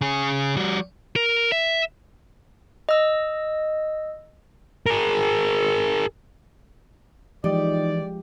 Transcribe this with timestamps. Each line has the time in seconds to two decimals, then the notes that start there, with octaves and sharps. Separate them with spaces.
0.01 C#3 G#4
0.56 G3 F#4
1.16 A#4
1.52 E5
2.89 D#5 E6
4.86 G#4 A#4
7.44 E3 F3 G#3 D#4 G4 D5